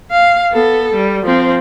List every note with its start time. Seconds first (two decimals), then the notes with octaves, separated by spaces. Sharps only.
0.11 F5
0.52 B3 A4
0.94 G3
1.25 F3 C4